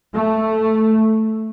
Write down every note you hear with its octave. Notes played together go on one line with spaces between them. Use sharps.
A3